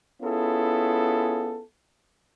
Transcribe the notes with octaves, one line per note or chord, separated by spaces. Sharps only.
B3 C#4 E4 F4 G#4 A4